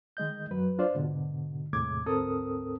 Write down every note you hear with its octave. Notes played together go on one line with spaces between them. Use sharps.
D#3 G#3 D#5 G6
F#2 F#3 B4
D4 F4 C5 D5
G#2 B2 D3
E2 A2 C3 G#3 D6 G#6
D2 G#2 C4 A4 A#4 D#6